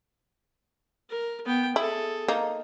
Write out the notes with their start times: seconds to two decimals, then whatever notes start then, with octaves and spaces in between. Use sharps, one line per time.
1.10 A#4
1.46 B3 G5
1.76 E4 G#4 A4
2.28 A#3 D#4